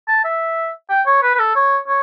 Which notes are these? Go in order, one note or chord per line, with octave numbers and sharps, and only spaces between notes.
A5
E5
G5
C#5
B4
B4
A4
C#5
C#5